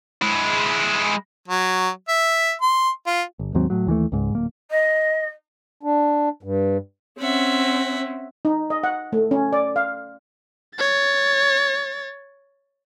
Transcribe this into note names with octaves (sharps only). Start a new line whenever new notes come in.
G#3 E4
F#3
E5
C6
F4
G1
D#2 G#2 F#3 C4
A2 F#3
D#2 E3 F#3 A3
C#2 G#2
D1 A#3
D#5
D4
G2
C4 C#4 E5 F#5
D#4
D#5
F#5
A3
C#4
D5
F5
C#5 A6